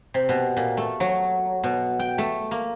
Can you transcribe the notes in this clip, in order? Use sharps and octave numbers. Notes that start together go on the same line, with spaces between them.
C3
B2
A#2
A3
F#3
B2
G5
A3
A#3